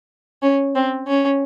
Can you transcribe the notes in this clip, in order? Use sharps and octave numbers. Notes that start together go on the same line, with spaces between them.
C#4
C4
C#4